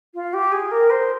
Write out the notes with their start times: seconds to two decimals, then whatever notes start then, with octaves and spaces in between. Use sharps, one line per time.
0.15 F4
0.33 G4
0.52 G#4
0.71 A#4
0.90 C5